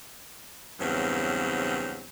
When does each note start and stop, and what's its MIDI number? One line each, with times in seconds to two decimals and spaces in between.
0.80 2.08 40
0.80 2.08 43
0.80 2.08 49
0.80 2.08 54
0.80 2.08 60